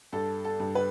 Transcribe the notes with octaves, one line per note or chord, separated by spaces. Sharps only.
G2 A4
A4
G2
B4